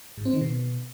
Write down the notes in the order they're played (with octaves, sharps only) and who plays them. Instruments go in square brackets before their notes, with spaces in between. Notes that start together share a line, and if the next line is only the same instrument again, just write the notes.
[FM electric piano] G#2
C4
D#3
B2